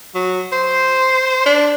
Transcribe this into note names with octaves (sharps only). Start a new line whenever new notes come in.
F#3
C5
D4